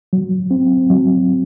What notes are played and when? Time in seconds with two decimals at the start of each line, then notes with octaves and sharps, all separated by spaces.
0.13 F#3
0.51 C4
0.90 F#3